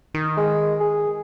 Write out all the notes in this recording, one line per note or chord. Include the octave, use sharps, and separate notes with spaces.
D#3
G#3
G#4